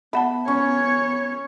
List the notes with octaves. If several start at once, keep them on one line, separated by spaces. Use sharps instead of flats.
B3 E5 F#5 A5 B5
C#4 C#5